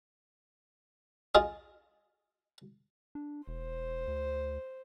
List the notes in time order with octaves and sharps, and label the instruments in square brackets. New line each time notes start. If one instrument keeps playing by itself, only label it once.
[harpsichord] F4 G#4 D#5
[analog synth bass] D4
[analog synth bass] E1 [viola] C5
[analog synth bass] D2